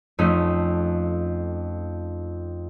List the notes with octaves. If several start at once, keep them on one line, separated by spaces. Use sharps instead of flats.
F2 A3 C#4 D#4